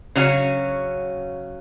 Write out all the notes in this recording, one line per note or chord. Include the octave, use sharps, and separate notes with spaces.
C#3 F#3 C#4 F#4